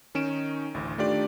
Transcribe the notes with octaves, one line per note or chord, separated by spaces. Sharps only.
D#3 C#4 D#4 D7 E7
A1 D2 A2
D#3 A3 D4 F4 G4 D5